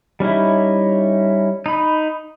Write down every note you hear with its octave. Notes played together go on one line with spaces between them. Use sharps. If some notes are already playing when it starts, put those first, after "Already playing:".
G3 C#4 D#4 E4
D#4 B5